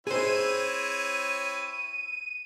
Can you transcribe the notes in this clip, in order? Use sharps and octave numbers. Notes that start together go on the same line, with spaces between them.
C4 E4 G#4 C5 C#5 D#7